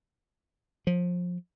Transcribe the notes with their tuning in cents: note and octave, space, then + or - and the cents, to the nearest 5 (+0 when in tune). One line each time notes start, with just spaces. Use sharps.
F3 +25